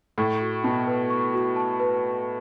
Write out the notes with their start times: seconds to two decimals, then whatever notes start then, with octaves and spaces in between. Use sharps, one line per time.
0.18 A2 C#6
0.41 F#4
0.64 B2 A5
0.87 B4
1.10 C#6
1.34 F#4
1.56 A5
1.80 B4